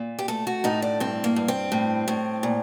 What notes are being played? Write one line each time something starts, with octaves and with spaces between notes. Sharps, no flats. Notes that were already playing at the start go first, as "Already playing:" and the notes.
Already playing: A#2
G4
A3 A4
F#4
A2 D#4
D4
G2 C4
A#3
G2
C4
A2
A2
A#2